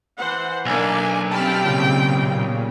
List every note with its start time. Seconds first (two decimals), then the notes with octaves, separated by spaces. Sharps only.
0.17 E3 C5 F#5
0.65 B1 A#3 D4 G#5
1.31 G3 C4 G5 A5 B5 F6
1.64 A#2 C#3